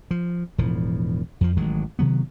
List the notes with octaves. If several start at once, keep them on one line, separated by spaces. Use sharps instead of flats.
F3
E1 A2 F3
F2 F3
A1 D#3 F#3 G#3
C3 D#3 F#3 B3